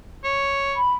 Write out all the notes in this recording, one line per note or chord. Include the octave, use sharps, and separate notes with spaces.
C#5
B5